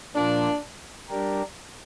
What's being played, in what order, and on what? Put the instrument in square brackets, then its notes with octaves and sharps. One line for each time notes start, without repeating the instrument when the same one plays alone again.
[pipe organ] A#2 F3 A#3 F4 [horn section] D4
[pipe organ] G3 D4 G4 A#4